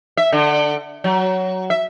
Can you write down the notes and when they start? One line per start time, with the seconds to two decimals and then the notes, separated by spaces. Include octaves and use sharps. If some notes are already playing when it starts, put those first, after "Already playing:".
0.17 E5
0.32 D3
1.04 F#3
1.70 E5